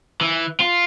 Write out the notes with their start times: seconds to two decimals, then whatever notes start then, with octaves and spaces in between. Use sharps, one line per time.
0.21 E3
0.60 F4